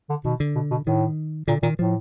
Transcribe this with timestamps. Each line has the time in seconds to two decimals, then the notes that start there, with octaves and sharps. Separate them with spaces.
0.10 D3
0.25 B2 D#3
0.40 D3
0.55 B2
0.71 B2
0.87 A2 D#3
1.48 A#2 D3
1.63 A#2 D#3
1.78 A2 F3